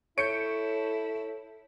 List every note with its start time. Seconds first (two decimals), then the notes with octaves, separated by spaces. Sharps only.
0.18 E4 A4 C#5 G6 C#7 D7